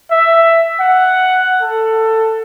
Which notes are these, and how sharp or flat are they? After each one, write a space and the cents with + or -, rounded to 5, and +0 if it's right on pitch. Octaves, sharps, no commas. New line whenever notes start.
E5 +10
F#5 +5
A4 +15